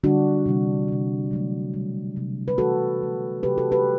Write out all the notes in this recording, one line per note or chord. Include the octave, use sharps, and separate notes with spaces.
D3 G3 D4 F#4
C3 E3 G3
C3 G3
C3 F#3 A3
B2 G3
C3 F#3 A3
B4
C3 E3 A3 F#4 A4
D3 A3
C3 F#3 A3 G4 B4
F#4 A4
G4 B4